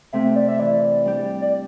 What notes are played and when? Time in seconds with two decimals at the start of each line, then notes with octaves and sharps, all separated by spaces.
0.13 C3 A3 C4 E5
0.36 D5
0.48 E5
0.59 E3 D5
1.05 G3 D4 G4
1.41 D5